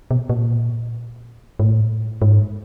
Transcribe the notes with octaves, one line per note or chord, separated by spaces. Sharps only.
B2
A#2
G#2
A2
G#2